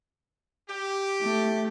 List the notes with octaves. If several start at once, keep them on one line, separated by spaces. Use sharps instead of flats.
G4
A3